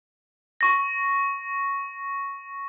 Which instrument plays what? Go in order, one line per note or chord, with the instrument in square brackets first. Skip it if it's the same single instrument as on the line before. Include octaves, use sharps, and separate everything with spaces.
[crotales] C#6 A#6